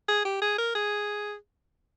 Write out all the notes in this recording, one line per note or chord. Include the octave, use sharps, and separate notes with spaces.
G#4
G4
G#4
A#4
G#4